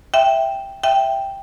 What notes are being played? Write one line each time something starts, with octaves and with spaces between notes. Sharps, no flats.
E5 G5
E5 G5